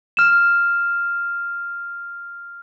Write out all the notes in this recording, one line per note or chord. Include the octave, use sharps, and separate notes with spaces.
F6 E7